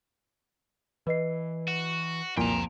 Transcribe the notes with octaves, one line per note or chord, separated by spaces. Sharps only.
E3 B4 D#5 C7
F#4
C2 F2 A#2 F3 G5 A#5